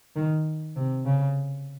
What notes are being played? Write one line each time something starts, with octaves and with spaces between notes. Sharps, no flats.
D#3
C3
C#3